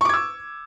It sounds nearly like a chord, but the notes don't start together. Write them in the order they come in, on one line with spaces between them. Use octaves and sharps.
C#6 D6 G#6 E6